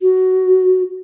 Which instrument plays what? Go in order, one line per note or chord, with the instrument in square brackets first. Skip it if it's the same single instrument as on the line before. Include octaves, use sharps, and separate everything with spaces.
[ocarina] F#4